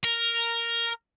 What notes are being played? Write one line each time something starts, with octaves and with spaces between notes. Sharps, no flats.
A#4